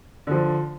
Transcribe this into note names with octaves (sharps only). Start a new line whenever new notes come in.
D3 F3